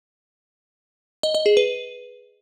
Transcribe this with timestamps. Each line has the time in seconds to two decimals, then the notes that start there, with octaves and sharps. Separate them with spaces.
1.23 D#5
1.35 D#5
1.46 G#4
1.57 B4